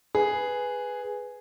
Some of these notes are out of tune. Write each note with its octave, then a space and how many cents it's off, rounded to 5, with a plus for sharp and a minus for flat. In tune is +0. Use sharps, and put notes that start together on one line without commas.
G#4 +0 B4 +0